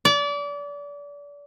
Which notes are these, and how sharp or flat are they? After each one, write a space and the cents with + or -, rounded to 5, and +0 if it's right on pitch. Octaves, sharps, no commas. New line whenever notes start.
D5 -30